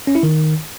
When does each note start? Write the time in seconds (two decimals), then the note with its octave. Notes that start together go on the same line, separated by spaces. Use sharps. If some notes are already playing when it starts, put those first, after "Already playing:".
0.07 C#4
0.15 E4
0.23 D#3